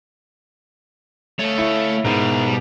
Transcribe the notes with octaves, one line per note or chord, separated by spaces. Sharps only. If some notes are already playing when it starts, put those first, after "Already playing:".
A3 C#5 F5
E4
G#2 B2 E4 A#4
G3